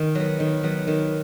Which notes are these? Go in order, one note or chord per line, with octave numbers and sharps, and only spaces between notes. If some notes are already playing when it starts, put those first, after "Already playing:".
Already playing: D#3
F#3 B3
D#3
F#3 B3
D#3